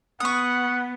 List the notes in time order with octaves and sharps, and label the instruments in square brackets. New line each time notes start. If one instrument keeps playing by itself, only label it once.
[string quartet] B3 [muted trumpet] F#5 [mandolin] C#6 D#6